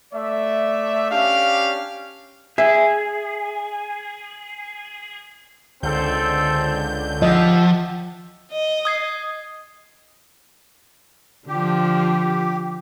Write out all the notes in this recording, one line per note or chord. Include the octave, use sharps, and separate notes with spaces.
A3 D5 E5
C#4 D4 G4 F5
G#4 E5
C#2 D3 C4 A4 G6
F3 G4 D#5 E5 F#5
D#5
D#6 G#6 C7
D3 F3 G4